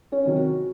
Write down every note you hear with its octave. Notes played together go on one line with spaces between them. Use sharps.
C#4 C#5
C3 D#3 F#3 C#4
F#4